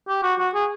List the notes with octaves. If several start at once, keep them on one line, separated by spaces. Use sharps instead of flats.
G4
F#4
F#4
G#4